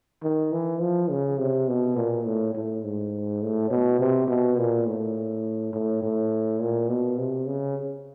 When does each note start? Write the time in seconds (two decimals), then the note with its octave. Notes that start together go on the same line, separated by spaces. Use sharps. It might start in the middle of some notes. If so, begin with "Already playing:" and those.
0.23 D#3
0.52 E3
0.81 F3
1.10 C#3
1.38 C3
1.68 B2
1.97 A#2
2.26 A2
2.54 A2
2.84 G#2
3.42 A2
3.70 B2
3.99 C3
4.28 B2
4.58 A#2
4.87 A2
5.73 A2
6.02 A2
6.61 A#2
6.89 B2
7.17 C3
7.47 C#3